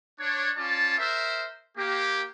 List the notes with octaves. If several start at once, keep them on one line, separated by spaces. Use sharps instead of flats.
D4 C#5
C#4 F4 D5 A5
A#4 C5 E5
A#3 G4